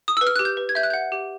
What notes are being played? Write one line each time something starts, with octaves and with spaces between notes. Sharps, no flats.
D#6
E6
B4
F6
G4 F#6
G6
B4
G#6
E5 G6
F#6
F#5 G6
G4